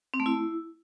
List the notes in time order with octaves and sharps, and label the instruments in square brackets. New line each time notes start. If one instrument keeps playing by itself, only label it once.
[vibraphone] C4
A3
E4